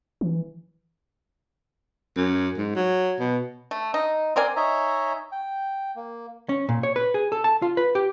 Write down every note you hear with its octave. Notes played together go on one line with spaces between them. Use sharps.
E3
F#2
G#2
F#3
B2
A3
D#4
C4 A#4 D5 G#5
D#4 C#5 D#5 E5 G#5 A#5
G5
A#3
C#4
A#2
C#5
B4
G#4
A4
A5
F4
B4
G4